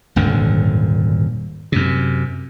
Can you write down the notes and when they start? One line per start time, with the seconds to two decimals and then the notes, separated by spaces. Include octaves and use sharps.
0.16 D#1 G#1 F#2 D3
1.72 F#2 C3